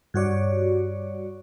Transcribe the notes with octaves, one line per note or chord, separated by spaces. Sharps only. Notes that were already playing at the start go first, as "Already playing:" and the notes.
G2 F#4 C#5 D5